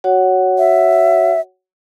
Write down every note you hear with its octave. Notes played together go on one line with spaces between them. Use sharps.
F#4 C#5 F#5
E5